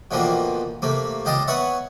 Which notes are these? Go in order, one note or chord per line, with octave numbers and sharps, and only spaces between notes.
B2 D3 E3 F3 A#3 C4
C3 A3 A#3
C#2 G4 D#5 F5 A5 D#6
B3 B4 C#5 E5 F#5